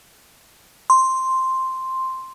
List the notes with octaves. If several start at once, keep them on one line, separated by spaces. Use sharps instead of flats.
C6